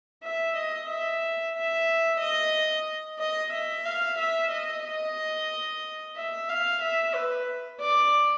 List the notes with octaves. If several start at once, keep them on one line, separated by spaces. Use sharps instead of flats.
E5
D#5
E5
E5
D#5
D#5
E5
F5
E5
D#5
D#5
E5
F5
E5
B4
D5